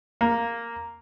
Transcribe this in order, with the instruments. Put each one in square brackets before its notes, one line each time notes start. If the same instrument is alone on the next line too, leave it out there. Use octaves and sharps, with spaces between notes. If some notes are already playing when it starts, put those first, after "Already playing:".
[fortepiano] A#3